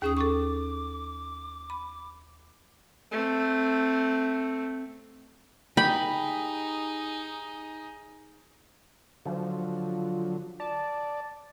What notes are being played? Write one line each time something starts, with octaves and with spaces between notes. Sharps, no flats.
D#2 C#4 G#4 D#6
A4 C#6 D6
B5
A3 C4
D#4 G4 G#4 B5
D3 F3 F#3
D5 A5